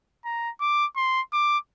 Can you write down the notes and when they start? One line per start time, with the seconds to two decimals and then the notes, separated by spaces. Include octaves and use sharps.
0.25 A#5
0.61 D6
0.96 C6
1.33 D6